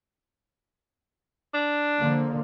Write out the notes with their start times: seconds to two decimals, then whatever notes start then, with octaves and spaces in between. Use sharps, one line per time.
1.54 D4
2.00 D3 F3 A#3